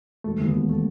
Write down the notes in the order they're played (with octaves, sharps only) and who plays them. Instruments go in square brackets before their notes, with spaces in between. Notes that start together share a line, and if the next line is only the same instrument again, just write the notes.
[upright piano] E1 [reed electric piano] A3
[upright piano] D#2
[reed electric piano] B3
[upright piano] E1
[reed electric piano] A3